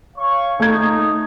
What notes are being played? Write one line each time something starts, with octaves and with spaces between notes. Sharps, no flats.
C#5 F5 C#6
A3 D#4 G#6